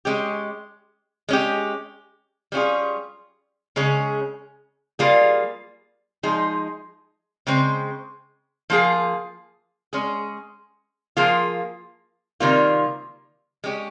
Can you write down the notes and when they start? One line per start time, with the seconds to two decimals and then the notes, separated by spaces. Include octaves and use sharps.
0.05 G#3 C#4 G4
1.29 G#3 C#4 G4
2.52 G3 C#4 F4 G#4
3.76 C#3 G#3 C#4 G#4
4.99 G3 A#3 F4 G#4
6.23 F3 G#3 D#4 G#4
7.47 C#3 G#3 C4
8.70 F3 A#3 F4 G#4
9.93 G#3 C#4 G#4
11.17 F3 A#3 F4 G#4
12.40 C3 D#3 G3 A#3 F4
13.64 G#3 C#4 G4